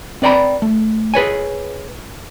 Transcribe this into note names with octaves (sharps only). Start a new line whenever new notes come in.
C4 B4 D5 G5 A#5 B5
A3
G#4 B4 C#5 G#5